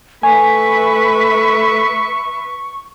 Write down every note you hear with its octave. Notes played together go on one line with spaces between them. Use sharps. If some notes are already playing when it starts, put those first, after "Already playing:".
A3 B4 E5 G#5 C#6